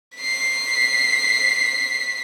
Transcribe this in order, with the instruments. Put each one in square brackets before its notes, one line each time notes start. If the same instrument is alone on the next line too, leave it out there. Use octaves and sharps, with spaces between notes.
[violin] B6 C7